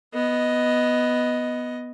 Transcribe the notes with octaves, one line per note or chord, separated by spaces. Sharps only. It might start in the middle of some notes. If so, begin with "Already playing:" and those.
B3 D#5